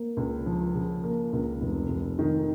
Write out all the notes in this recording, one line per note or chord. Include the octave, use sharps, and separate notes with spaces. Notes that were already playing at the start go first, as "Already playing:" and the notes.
Already playing: A#3
C#2
F3
C#3
A#3
C#2
F1
F1
D#3